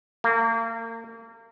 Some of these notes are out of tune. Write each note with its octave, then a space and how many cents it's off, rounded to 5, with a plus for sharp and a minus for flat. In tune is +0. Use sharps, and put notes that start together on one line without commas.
A#3 -35